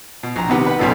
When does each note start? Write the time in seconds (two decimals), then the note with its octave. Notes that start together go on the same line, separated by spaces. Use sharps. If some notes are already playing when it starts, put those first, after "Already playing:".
0.23 B2
0.36 A#1 A#5
0.49 C3 D#3 B3 G4
0.66 B4 F#5
0.79 B1 G2 B2 C#4 D#4 A4